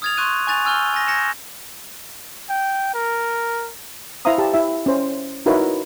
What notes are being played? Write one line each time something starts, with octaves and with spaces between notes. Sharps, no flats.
D#6 F6 G#6 A6 F7
C6 C#6 F#6 D#7
G#5 C#6 F#6 A6 F7
G#5 E6 F6 G6 G7
G#5 A#6
G6 G#6 A#6 C#7 E7
G5
A#4
E4 C5 E5 F5 A#5 D#6
G4 A5
E4 E5
C#4 C5
D#4 E4 F#4 A#4 B4 C#5